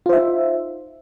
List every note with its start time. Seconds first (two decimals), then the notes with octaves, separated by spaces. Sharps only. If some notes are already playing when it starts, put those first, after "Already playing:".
0.06 F4
0.09 C5
0.13 E5
0.16 D#4